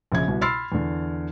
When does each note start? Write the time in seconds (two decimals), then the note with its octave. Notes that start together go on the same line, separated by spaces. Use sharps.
0.12 A#1 C#3 G#6
0.28 C2 B2
0.41 B5 C6 E6 F6 A6 C7
0.72 E2 D3